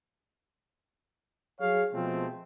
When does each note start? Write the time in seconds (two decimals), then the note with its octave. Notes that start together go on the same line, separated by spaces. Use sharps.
1.61 F#3 G#4 C#5 F5
1.93 B2 F3 G#3 A3 C4